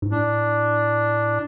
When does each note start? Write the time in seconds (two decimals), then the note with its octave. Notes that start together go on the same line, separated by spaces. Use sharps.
0.02 G#2
0.12 A2 D4